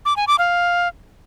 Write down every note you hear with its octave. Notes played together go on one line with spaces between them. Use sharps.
D6
G#5
D6
F5